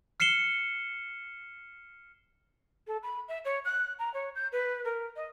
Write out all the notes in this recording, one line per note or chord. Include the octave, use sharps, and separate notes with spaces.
F6 C7 C#7 E7 G7
A4
B5
E5
C#5
F#6
A#5
C#5
G6
B4
A#4
D#5